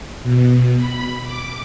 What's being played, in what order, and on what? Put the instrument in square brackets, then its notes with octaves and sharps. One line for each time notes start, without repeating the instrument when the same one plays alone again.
[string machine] B2
B5
D6